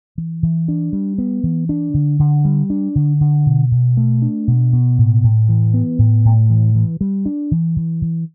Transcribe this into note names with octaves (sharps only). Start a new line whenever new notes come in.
E3
E3
D4
G3
B3
E3
D4
D3
D3
G3
D4
D3
D3
B2
B2
A3
D4
B2
B2
A2
A2
E3
B3
A2
A2
E3
E3
G3
D4
E3
E3
E3